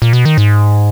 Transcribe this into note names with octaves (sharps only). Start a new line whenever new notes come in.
A#2
B2
D#3
G#2